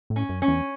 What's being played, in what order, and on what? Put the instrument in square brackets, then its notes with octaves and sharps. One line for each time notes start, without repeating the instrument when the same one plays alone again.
[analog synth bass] A2
[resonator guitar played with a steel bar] C#4
[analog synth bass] F#2
[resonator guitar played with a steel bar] C#4
[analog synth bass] E2